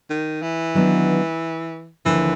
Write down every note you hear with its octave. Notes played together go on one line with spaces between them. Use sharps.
D#3
E3
D#3 F#3 B3 D4
D#2 D3 E3 F3